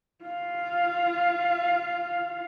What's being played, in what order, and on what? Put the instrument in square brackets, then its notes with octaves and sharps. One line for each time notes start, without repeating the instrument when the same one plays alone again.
[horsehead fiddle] F4 F5